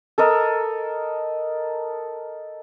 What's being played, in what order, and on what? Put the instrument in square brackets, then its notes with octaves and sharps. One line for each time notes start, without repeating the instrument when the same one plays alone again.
[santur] A4 A#4 D#5